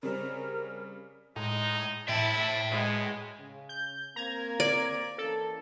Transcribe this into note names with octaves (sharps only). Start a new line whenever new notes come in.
C#3 G3 C4 A#4
A2 G#3 D#4
A2 E4 E5 G5 A5
B2 G#3
C#3
G6
A#3 C4 A#5 G#6
D5
E3 A#3 C#4 A4